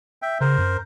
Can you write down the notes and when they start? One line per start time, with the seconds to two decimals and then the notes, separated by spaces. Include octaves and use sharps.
0.22 E5 G5
0.41 C#3 A#4 C5
0.58 F#2